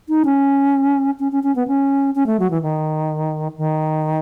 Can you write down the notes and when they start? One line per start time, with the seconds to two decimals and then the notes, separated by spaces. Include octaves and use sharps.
0.09 D#4
0.25 C#4
1.20 C#4
1.32 C#4
1.43 C#4
1.56 B3
1.68 C#4
2.15 C#4
2.26 A3
2.40 F#3
2.51 E3
2.62 D#3
3.58 D#3